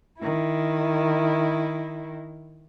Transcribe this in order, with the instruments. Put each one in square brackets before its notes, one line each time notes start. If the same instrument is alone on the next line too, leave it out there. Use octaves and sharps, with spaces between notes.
[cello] D#3 E4